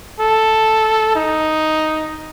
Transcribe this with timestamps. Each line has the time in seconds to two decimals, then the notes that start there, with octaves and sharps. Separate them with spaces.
0.20 A4
1.15 D#4